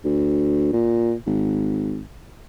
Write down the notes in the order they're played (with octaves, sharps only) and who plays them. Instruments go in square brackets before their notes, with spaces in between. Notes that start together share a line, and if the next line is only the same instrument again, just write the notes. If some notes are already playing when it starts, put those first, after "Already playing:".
[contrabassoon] D2
A#2
G#1